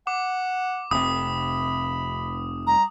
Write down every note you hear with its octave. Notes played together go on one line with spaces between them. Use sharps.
F#5 D6
F1 C3 B5 D#6
G3 A#5